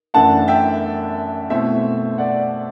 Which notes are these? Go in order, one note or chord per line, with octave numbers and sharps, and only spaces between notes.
F#2 E3 A3 D4 F#5 A5
E5 G5
B2 A3 C4 E4 E5
D5 F#5